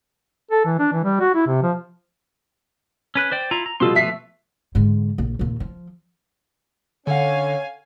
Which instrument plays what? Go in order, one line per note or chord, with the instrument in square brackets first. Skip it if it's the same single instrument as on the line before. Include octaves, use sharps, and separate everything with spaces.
[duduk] A4
E3
D4
E3
G3
F#4
E4
C3
F3
[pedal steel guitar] C#4 B4 F#6
C5 D5 G5
E4 F4 A#5
A#5
[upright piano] B2 F3 G3 [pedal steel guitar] F4 A4 C6
[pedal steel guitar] F3 A3 B3 [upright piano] E5 B6 C7
[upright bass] G#2 D3
A#1
D#2 A#2
F3
[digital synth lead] D3 [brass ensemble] C#4 C#5 [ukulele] A4 F#5 [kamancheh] F5 G#5